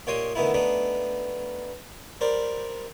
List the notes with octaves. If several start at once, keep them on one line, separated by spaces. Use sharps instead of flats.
A#2 G4 C#5 D#5 C6 D#6
D3 D#3 A3 B3 D#4 E4
A3 B3 D4 D#4
G3 A#4 C5 D5